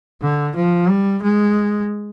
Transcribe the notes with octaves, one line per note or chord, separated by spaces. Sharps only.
D3
F3
G3
G#3